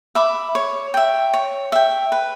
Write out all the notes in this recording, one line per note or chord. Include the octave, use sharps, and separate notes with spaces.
E5 B5 D6
C#5
E5 G5
C#5
E5 G5
B4